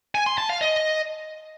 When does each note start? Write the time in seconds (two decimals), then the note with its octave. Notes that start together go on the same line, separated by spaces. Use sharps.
0.15 G#5
0.26 C6
0.38 A5
0.49 F5
0.61 D#5